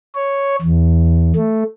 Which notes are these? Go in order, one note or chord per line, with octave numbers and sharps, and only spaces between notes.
C#5
E2
A3